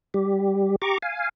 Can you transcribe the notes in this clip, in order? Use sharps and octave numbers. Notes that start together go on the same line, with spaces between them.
G3 G4
G4 A#5 C#6 D6
F5 G#5